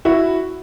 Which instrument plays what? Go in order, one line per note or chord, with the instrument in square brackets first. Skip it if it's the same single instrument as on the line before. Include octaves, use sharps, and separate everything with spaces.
[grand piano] E4 F#4